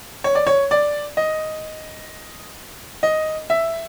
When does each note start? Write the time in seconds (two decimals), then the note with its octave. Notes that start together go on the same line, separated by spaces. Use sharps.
0.24 C#5
0.35 D5
0.47 C#5
0.71 D5
1.17 D#5
3.03 D#5
3.50 E5